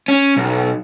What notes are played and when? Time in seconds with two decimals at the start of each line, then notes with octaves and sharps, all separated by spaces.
0.08 C#4
0.36 B1